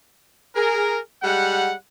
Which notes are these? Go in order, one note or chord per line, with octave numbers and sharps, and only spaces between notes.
G#4 A#4
G3 G#3 F#5